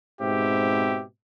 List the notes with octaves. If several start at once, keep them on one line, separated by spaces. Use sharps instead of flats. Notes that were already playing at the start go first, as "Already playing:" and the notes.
G#2 B2 C4 G4 E5